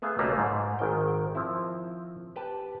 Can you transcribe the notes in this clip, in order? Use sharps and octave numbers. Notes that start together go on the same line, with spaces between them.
A3 B3 G#4 E5 F5
B1 C#3 G3 A3 A#3
G#2
G#1 D#3 G5
F3 C4 E4
G4 B4 G5 A5